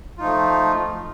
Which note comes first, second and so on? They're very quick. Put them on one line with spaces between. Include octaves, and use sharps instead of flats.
F4 D#4 F3 A3